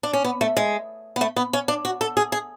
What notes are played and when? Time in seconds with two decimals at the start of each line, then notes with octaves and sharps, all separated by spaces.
0.03 D4
0.13 C#4
0.24 B3
0.41 A3
0.57 G#3
1.16 B3
1.21 A3
1.36 B3
1.53 C#4
1.68 D4
1.85 F#4
2.01 A4
2.17 G#4
2.32 G#4